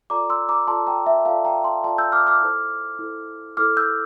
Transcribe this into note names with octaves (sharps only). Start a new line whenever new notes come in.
F4 A4 D5 A#5 D6
C6 E6
A#5 D6
F4 A4 D5 A5 C6
G5 A#5
E5 G5
F4 A4 D5 F5 A5
G5 A#5
A5 C6
F4 A4 D5 A5 C6
E6 G6
D6 F6
D6 F6
E4 A4 C5
E4 A4 C5
E4 A4 C5 D6 F6
E6 G6